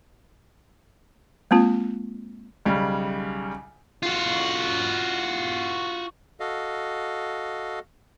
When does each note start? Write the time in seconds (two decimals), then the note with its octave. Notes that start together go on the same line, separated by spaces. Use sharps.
1.51 G#3 A#3 C4 F4
2.65 B1 C#3 G3
4.03 F4 F#4
6.40 F#4 A4 D#5 F5